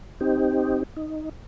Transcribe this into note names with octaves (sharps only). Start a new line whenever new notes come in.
C4 D#4 G4
D#4